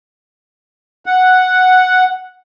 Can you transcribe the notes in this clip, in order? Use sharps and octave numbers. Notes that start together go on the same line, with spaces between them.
F#5